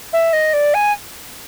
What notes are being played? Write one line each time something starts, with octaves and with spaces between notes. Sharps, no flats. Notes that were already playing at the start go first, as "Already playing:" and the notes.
E5
D#5
D5
G#5